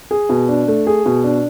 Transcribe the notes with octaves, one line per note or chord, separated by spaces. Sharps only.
G#4
B2
D4
A3
G#4
B2
D4